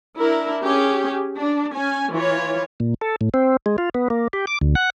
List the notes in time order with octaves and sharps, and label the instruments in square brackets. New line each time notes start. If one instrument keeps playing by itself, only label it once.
[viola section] D4 E4 A#4
C#4 G4 G#4
D4
C#4 G#5
E3 F4 C#5
[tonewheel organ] A#2
A4
A2
C4
G#3
F4
B3
A#3
G4
D6
D2
F#5